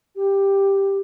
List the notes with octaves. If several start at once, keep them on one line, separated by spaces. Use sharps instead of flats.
G4